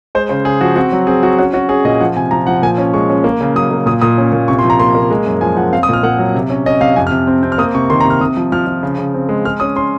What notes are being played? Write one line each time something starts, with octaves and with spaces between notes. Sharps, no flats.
G#3 C5
C#3 C5
C#3 G#4
F3 F#4
C4 F#4
F#3
C4 G#4
F#3 F#4
C#4 F#4
C#4 F#4
C#4 G#4
A#2 D#5
F3 F#5
C3 G#5
F3 A#5
F3 F#5
A#2 G#5
C#4
G#3 C#6
C#4
A#3
C#3
F#3 D#6
A#3
A#2 D#6
A#2 D#6
C#4
A#2
C3 C#6
C6
F3
A#5
A#3 C6
A#3
G#3
F#2
F3 G#5
F3 F#5
C4 F5
D#6
A#2 F6
A#2 F#5
F#3
C3
C#4
C#4 D#5
C3 F5
F2 G#5
F6
C3
C4
C4
F6
A#3 D#6
C3 C#6
D#3 C6
A#5
C3 F6
C3 D#6
F3
F3 F6
F3
C#3
C#3
C4
G#3
G#3 F6
C#4 D#6
C#4 C6